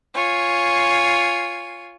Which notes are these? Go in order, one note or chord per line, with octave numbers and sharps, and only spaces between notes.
F4 C#5 G#5